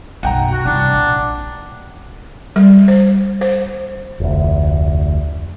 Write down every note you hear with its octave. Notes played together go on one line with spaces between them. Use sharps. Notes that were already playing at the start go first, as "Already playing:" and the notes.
B1 F#2 F#5 G5 A#5
F#4
C2 G2 D4
A#1
G3
C5
C5
F1 D2